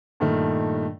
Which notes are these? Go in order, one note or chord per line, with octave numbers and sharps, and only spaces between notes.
G2 A#2 D#3 A3